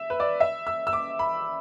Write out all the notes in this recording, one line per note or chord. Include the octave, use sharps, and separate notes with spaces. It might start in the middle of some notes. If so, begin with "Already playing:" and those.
Already playing: E5
B4
D5
E5
E6
E6
D6
B5